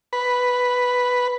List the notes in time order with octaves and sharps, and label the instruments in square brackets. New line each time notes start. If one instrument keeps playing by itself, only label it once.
[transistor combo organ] B4